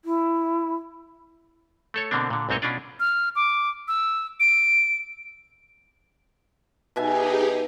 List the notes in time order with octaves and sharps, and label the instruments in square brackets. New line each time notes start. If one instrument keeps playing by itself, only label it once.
[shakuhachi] E4
[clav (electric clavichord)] A3 A4 C#5
B2 D3 A#3 C4 D4
A#2 D3
B1 G#2 C4 C5 C#5 D#5
B2 C#4 D4 F4 D5
[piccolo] F6
D6
E6
D7
[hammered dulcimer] B2 E5 G#5 [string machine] D#4 G4 G#4